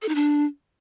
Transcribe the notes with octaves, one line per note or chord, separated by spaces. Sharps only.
A4
D#4
D4